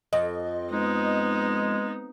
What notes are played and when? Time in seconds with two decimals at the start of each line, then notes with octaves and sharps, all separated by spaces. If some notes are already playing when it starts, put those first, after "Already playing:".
0.13 F2 D#5
0.71 G#3 B3 D#4